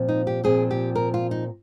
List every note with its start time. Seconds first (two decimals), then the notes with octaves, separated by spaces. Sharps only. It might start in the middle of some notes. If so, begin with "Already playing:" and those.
Already playing: A#2 F3 C4
0.09 D#4
0.27 G4
0.44 A#2 F3 C4 G#4
0.71 G4
0.95 A#4
1.14 F4
1.31 D#4